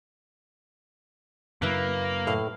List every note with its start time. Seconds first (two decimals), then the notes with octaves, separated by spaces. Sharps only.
1.62 F#2 C#3 F#3 A#3 E4 B4
2.27 A2 F5